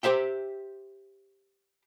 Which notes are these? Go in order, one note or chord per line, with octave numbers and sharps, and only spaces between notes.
G4 C5 E5 G5